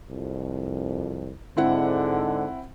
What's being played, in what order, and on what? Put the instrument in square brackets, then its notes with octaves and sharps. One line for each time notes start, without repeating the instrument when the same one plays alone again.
[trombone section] C2 F2
[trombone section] G#2 D3 [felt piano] C4 E4 F#5